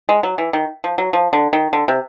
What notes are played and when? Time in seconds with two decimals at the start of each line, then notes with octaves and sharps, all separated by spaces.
0.09 G#3
0.23 F#3
0.38 E3
0.53 D#3
0.84 F3
0.98 F#3
1.13 F3
1.33 D3
1.53 D#3
1.73 D3
1.88 C3